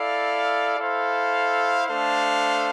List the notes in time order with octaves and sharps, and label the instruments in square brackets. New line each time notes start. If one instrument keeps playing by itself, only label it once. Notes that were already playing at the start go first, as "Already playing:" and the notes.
Already playing: [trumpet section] E4 A4 D5 F5
E4 A4 C5 F5
A3 D4 A4 C5 F5